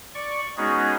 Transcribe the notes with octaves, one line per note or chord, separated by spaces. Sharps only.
D5 C#6
G#3 B3 C#4 D#4 F#4 G#4